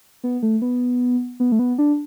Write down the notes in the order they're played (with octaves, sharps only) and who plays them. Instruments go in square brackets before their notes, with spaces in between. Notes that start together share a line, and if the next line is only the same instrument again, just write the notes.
[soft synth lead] B3
A3
B3
B3
A3
B3
D4